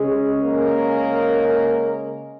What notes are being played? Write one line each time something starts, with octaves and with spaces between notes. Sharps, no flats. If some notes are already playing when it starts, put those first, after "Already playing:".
Already playing: C#3 G#3 C#4 G#4
A#3 A#4